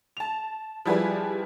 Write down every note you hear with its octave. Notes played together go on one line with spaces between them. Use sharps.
A5 F7
F3 G3 E4 G4 G#4 B4